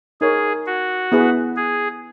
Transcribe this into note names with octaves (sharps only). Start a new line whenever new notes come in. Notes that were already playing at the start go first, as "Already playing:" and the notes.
D#4 G#4 A#4 C#5
F#4
B3 E4 G#4 B4
G#4